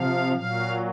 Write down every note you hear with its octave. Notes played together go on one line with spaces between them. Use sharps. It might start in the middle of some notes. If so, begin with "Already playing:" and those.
Already playing: C3 F3 F5
A#2 F#3 F5